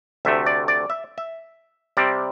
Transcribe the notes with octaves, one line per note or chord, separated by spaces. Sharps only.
D2 C3 A3 E5
D5
D5
E5
E5
C3 G3 C4 D5